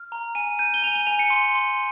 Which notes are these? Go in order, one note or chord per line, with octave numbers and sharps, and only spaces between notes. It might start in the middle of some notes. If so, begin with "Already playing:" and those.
Already playing: F6
A#5
G#5 D#7
G6 D#7
G7
G#5 F7
G7
G#5 F7
C#7
C6
C6